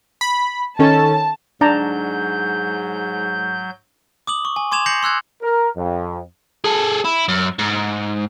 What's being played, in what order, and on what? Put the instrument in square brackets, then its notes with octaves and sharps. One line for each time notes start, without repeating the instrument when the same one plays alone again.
[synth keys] B5
[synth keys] D#3 C#4 A4 [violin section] A5
[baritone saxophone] G#2 [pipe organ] F#3 G6 [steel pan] D4 A5 A#5
[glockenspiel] D6 D#6 F#7
C#6
G#5
C6 D6 G#6 E7 F7
G6 A#6 C7 C#7 F#7
C6 E6 F#6 G#6
[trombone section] A#4
F2
[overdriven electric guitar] G#4 A4
E4
F#2
G#2